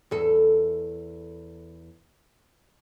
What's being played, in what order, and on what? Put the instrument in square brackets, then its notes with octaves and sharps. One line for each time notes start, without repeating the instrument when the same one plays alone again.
[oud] E2 A4